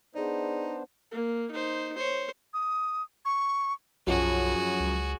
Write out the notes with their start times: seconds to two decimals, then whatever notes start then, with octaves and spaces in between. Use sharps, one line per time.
0.15 B3 D4 D#4 G#4 C5 D5
1.12 A#3
1.51 D#4 C5
1.96 C5 C#5
2.54 D#6
3.25 C#6
4.07 B1 F#2 F3 F#3 F#4 G#4
4.80 C#2